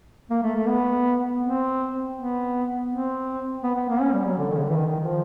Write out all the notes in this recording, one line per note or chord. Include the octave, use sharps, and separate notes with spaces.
A#3
A3
A3
B3
C4
B3
C4
B3
B3
A#3
C#4
G3
F#3
D3
D#3
C#3
D3
E3
D#3
D#3
F3